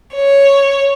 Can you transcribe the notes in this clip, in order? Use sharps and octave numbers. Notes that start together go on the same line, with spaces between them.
C#5